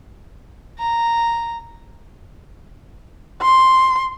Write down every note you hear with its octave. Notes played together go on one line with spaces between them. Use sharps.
A#5
C6